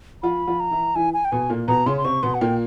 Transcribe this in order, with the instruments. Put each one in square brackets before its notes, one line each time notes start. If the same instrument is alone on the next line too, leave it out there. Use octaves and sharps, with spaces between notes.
[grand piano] F3 F4 [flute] B5
[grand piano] F3 F4
[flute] A#5
[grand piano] E3 E4
[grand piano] E3 E4 [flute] G#5
[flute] G#5
G5
[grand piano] B2 B3 [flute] G#5
[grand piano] A#2 A#3
[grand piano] B2 B3 [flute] A#5
[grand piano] C#3 C#4 [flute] C6
[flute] C6
[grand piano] C3 C4 [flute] C#6
[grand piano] B2 B3 [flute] C6
[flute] F#5
[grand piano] A#2 A#3 [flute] G5